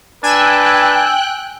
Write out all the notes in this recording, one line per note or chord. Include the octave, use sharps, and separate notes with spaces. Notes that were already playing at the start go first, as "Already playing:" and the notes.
D4 B4 G5 G#5 E6 F#6